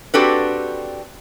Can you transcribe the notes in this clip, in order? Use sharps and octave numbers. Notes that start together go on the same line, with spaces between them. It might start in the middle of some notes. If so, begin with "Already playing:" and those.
C4 D4 F#4 G4 A4 B4